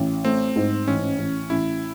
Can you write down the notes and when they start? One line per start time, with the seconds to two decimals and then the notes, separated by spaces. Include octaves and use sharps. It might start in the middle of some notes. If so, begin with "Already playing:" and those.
Already playing: A1
0.24 A3 C4
0.56 G#2
0.88 A1 C#4
1.19 A1
1.50 A1 E4